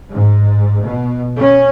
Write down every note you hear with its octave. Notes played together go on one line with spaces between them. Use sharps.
G#2
B2
C#4